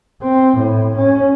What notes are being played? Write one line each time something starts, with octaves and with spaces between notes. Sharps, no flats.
C4
A2
C#4